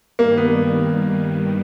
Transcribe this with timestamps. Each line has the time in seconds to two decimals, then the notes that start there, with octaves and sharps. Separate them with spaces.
0.18 G2 D#3 G3 A#3
0.37 B3